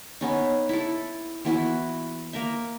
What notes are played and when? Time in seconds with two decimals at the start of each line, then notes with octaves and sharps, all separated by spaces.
0.21 B3 C#4 D#4
0.69 E4 A4
1.45 E3 B3 E4 F#4
2.33 A#3 A#4 E5